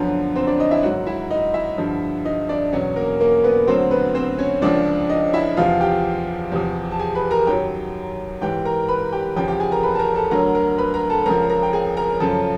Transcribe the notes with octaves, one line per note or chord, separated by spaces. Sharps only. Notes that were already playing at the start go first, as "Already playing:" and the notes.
Already playing: F#2 D3 F3 B3
C4 C5
D4 D5
D#4 D#5
E4 E5
G#2 D#3 F#3 F#4 F#5
E4 E5
D#4 D#5
E4 E5
G2 D3 F3
D#4 D#5
D4 D5
E2 B2 F#3 C#4 C#5
A#3 A#4
A#3 A#4
B3 B4
D2 D3 F#3 C4 C5
B3 B4
C4 C5
C#4 C#5
C#2 C#3 F3 D4 D5
D#4 D#5
E4 E5
E2 C3 F3 F4 F5
G4 G5
E2 C3 F3
A5
G#4 G#5
B4 B5
A#4 A#5
F#2 D#3 F#3 G4 G5
G#2 E3 G4 G5
A#4 A#5
B4 B5
G4 G5
E2 C#3 F3 G4 G5
G4 G5
G#4 G#5
A#4 A#5
B4 B5
A5
A#4 A#5
A4 A5
D2 D3 F#3 A#4 A#5
A#4 A#5
B4 B5
A#4 A#5
A4 A5
C#2 C#3 F3 A#4 A#5
A#4 A#5
G5
G#4 G#5
A#4 A#5
F#2 C#3 F3 A4 A5